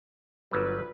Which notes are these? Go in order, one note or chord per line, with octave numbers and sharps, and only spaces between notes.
G1 D2 F#3 G3 F4 B4